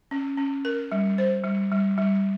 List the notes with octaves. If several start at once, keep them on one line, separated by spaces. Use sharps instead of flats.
C#4
C#4
A#4
G3
C5
G3
G3
G3